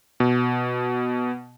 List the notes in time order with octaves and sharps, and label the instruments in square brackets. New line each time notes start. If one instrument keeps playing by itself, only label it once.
[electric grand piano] B2